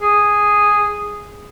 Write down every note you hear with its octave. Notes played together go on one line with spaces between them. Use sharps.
G#4